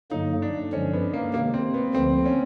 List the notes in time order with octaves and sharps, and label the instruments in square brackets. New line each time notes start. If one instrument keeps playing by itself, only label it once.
[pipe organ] G2 D3 F#3 A#3 [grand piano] D#4
[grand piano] D4
[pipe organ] G2 D3 F3 G#3 [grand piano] C#4
[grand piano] B3
A#3
[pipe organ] C3 D#3 G#3 [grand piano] A#3
[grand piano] C4
B3
[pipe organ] D2 D3 F3 [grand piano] C4
[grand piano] C#4